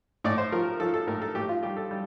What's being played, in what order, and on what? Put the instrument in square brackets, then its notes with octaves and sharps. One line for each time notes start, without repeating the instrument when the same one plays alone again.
[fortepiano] A2 D5
C5
F3 A#4
F3 A4
A4
A2 A#4
A4
A2 G4
F4
G3 G4
A4
G3